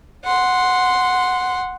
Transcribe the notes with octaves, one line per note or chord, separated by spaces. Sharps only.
F#5 C6